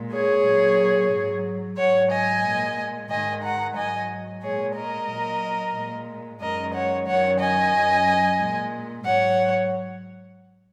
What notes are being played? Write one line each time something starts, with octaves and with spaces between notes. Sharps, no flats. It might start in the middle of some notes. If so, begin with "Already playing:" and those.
Already playing: A#2 G#3
G#4 C#5
A#2 F#3
G#2 F#3
G#2 F#3 C#5 F#5
D#5 G#5
A#2 G#3
G#2 D#3 G#3 D#5 G#5
F#5 A#5
G#2 F#3 D#5 G#5
A#2 G#3 G#4 C#5
A#4 D#5
A#2 F#3
A#2 G#3
F#2 D#3 G#3 A#4 D#5
C#5 F#5
F#2 D#3 F#3 C#5 F#5
D#5 G#5
F#2 F#3
A#2 G#3
G#2 F#3 C#5 F#5